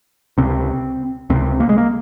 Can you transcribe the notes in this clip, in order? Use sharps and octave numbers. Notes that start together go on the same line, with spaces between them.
C#2 C3 C4
C#2 C3 C4
A#3
G#3
A#3